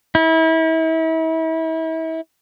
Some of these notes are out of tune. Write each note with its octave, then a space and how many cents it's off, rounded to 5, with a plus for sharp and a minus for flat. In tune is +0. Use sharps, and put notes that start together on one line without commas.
E4 -35